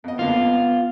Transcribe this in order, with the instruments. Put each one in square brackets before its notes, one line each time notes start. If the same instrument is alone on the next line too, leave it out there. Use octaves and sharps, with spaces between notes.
[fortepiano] F2 D#5 [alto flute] B3
[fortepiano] F2 D3 A#3 [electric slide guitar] F4
[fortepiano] F2